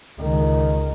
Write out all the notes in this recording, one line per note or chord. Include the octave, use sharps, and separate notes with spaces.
C#2 D#3